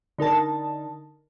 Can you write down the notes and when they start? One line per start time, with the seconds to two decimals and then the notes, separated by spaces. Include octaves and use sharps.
0.18 D3 D#4 A#4 A5